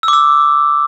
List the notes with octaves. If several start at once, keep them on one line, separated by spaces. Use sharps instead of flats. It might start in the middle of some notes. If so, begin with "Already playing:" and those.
E6
D6
E6